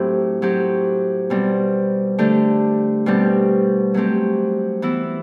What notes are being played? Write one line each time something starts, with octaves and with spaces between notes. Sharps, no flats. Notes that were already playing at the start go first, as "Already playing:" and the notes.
Already playing: A2 F#3 C4 E4 G4
F#3 C4 G4
B2 G3 C4
D3 A3 D4 G4
B2 G3 C4 G4
F#3 A3 C4 G4
E3 B3 E4